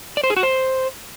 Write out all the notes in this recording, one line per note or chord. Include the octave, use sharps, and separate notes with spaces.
D5
C5
G#4
F#4
C5